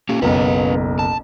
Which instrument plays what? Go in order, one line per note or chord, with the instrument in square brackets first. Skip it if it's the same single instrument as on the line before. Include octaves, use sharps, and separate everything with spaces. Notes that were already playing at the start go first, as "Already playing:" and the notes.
[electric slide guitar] A#3 C#4 G4
[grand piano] F#1 B1 [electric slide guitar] C#4 B4
[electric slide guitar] A5